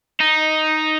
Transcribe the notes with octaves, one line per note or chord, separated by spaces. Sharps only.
D#4